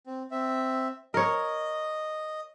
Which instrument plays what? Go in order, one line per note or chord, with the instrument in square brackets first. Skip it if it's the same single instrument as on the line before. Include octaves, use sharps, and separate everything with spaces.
[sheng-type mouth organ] C4
C4 E5
[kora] A#4 C#5 [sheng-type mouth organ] D#5